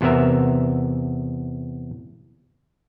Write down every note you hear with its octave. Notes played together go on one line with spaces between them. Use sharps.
E2 C3 B3 A#4 E5